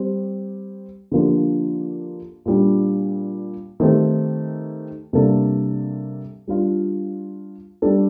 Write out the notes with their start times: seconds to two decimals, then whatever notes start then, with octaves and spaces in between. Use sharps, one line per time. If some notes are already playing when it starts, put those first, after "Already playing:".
Already playing: G3 C4 G4
1.12 D3 F3 A#3 D4 G4
2.46 A#2 G3 D4
3.80 D#3 A3 C4 G4
5.13 C3 G3 A#3 D4 A4
6.47 G3 D4 F4
7.82 G3 D4 A4